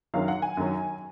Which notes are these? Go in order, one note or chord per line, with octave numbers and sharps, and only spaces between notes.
F#2 D#3 F#3 F5
F#5
G#5
F#2 D#3 F#3